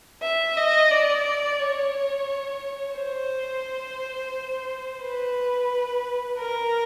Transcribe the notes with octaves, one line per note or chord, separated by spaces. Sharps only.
E5
D#5
D5
C#5
C5
B4
A#4